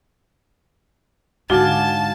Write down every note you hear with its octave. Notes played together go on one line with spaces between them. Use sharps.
G#2 D3 F#4 D5 F5 G#5 A5 G7